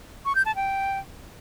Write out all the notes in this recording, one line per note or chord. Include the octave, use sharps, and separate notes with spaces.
C#6
G6
A5
G5